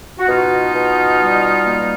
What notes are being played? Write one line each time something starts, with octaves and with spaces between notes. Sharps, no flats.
F#4
B2 D#4 F4
B2
G3
A#3